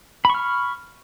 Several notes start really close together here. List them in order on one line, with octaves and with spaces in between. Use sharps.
B5 C#6 F6